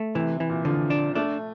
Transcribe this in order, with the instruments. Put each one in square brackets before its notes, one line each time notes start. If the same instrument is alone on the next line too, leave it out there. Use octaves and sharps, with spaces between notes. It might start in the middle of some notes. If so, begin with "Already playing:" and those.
Already playing: [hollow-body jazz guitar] A3
[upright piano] C3 [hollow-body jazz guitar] E3
[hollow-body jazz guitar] E3
[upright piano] A#2
[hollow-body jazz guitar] D3 [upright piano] F3
[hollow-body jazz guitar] D4
[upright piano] A3 [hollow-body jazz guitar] D4